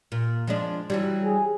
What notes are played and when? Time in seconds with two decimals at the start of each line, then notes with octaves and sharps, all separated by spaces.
0.12 A#2
0.47 F3 G#3 D4
0.90 E3 F#3 G3
1.24 G#4